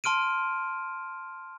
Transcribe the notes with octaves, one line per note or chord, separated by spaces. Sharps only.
A5 C6 F6 D7 D#7